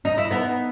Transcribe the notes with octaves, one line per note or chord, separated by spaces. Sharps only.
D#4
E4
B3 D#4